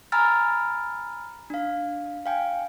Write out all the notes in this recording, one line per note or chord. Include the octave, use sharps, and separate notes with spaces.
G#5 A#5 B5 E6 F6 A6
D4 F5
F5 G5 G#5